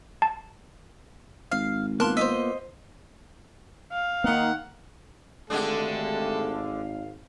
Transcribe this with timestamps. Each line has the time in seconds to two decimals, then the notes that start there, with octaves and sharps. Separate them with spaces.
0.22 A5
1.52 G#1 F5
2.00 A#3 B3 F4 A#4 A5 C6 F#6
2.17 C5 D5 D#5 E6 B6
3.92 F5
4.24 D#3 A#3 B3 D#4 F#5
5.50 G#1 D3 G#3 A3 D4 G4 A4 F5